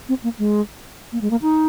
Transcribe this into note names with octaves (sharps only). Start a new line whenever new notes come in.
C4
A#3
G#3
A#3
G#3
A#3
D#4